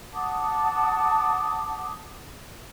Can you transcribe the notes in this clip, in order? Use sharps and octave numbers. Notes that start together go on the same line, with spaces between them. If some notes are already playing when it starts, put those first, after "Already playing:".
F#5 A5 D6 D#6